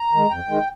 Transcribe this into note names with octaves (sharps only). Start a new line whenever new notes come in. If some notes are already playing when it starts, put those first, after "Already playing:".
Already playing: A#5
D#3 G#3
F2 G5
D#3 G#3